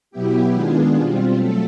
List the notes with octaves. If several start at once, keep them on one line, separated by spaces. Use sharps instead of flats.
B2 F#3 B3 E4 G4
D#3 G#3 B3 D4 F4 G#4
B2 G3 C4 F4
F#3 A3 A4